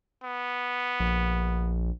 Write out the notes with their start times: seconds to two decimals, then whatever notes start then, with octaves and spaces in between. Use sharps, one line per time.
0.23 B3
1.00 A#1